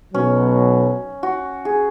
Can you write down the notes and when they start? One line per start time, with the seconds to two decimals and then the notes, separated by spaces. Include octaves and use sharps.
0.14 B1 B2 F#3 C#4
1.23 F#4
1.65 G#4